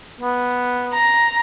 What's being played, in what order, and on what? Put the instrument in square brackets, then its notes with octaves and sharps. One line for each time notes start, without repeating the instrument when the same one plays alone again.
[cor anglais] B3
[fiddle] A#5